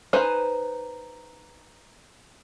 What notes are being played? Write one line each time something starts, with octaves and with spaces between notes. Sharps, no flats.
D#4 B4 C5 G#5